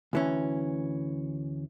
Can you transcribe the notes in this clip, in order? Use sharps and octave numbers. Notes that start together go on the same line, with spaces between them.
D2 E3 C#4